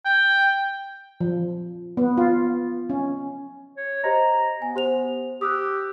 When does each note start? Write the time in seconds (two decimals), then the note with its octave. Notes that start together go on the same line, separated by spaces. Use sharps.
0.05 G5
1.21 F3
1.97 B3
2.17 F4
2.90 C#4
3.77 C#5
4.03 G4 C5 D#5 A#5
4.62 B3 G#5
4.76 G4 C5 F7
5.41 G4 D#6 E6 F#6